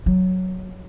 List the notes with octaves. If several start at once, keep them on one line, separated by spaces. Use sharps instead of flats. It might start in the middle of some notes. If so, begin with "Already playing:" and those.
F#3